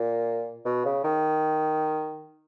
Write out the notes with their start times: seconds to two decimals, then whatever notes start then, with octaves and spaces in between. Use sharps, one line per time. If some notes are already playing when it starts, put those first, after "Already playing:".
Already playing: A#2
0.66 B2
0.85 C#3
1.04 D#3